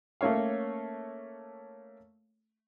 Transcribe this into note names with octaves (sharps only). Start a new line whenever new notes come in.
A3 A#3 C#4 C#5 F5